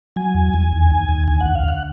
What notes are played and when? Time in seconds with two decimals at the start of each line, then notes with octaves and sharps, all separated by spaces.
0.16 F#3 G#5
0.34 E2
0.54 E2
0.73 D#2
0.91 D#2
1.09 D#2
1.27 D2 G#5
1.41 F#5
1.46 D2
1.55 F5
1.64 D2 F#5